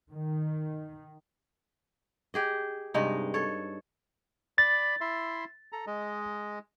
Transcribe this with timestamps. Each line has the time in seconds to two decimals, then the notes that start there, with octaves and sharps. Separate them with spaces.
0.13 D#3
2.34 G4 G#4 D#5
2.94 G2 C3 G#3 D#4
3.34 A4 C#5
4.58 D5 B5 A6
5.01 E4 E5 C6
5.72 A4 A#5
5.87 G#3 D#5